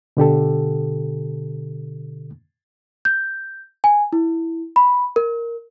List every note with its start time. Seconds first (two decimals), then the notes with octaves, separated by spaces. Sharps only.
0.17 B2 D3 G4 A4
3.05 G6
3.84 G#5
4.13 E4
4.76 B5
5.16 A#4